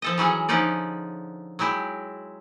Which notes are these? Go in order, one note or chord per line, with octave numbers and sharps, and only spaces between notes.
F3 A4 D#5
E3 F#3 C#4 G#4
D3 F3 C#4 D#4 D5
F#3 G#3 E4 G4